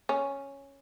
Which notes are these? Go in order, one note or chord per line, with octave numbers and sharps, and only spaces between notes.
C#4